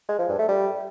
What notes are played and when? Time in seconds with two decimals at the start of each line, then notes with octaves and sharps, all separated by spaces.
0.09 G#3
0.19 F3
0.29 G2
0.39 A3
0.49 G3